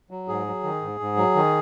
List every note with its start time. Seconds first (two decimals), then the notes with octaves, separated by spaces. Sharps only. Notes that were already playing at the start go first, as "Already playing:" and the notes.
0.11 F#3
0.28 G#2 G#4
0.47 F#3
0.64 D#3
0.82 G#2
1.00 G#2
1.17 F#3
1.36 D#3